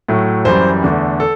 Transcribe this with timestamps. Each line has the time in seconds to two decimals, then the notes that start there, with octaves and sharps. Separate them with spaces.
0.09 A2 F#3 A3
0.45 F#2 E3 G3 C5
0.82 E2 D3 A3
1.20 A4